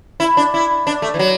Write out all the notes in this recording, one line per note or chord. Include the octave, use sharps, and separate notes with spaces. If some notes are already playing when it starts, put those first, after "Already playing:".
E4
D4
E4
D4
A3
E3
F#3